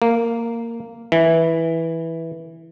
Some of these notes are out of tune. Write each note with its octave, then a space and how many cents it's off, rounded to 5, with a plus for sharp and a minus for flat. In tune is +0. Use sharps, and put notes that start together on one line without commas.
A#3 -10
E3 -10